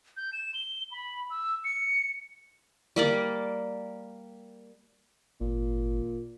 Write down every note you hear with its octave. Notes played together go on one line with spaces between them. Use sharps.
G6
E7
G7
B5
E6
C#7
G3 A#3 D5
G#1 A#2